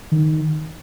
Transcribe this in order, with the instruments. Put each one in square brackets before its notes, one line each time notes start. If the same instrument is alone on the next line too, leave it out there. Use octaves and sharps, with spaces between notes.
[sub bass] D#3